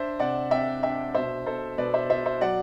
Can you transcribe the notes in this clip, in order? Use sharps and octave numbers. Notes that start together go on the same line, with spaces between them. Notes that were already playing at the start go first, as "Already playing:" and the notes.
Already playing: D4 C5 E5
C3 D5 F#5
C3 E5 G5
D4 E5 G5
B2 C5 E5
B2 A4 C5
B2 B4 D5
C5 E5
B2 C5 E5
C5 E5
F#3 D5 F#5